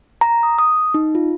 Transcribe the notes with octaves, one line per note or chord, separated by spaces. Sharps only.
A#5
D#6
D#6
D#4
F4